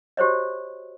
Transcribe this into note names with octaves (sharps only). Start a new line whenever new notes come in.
F#4 G4 C5 C#5 D#5